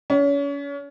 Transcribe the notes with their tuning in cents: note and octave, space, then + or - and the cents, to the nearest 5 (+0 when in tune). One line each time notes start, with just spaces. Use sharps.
C#4 +35